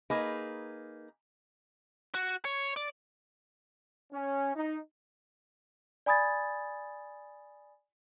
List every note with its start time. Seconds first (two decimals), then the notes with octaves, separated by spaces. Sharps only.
0.10 A#3 D#4 G#4 B4
2.15 F#4
2.45 C#5
2.76 D5
4.12 C#4
4.55 D#4
6.06 D5 G#5 B5 D#6 G#6 A6